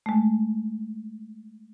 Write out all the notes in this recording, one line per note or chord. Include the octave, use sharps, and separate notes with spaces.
G#3 A3